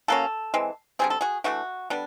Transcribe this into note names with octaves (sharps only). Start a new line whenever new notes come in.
C#3 F#3 A#3 C#4 A4
E3 G#3 C4
D3 G3 C4 G#4
A4
F#4 G#4
E3 A3 D4 E4 F#4
D3 G3 B3 D4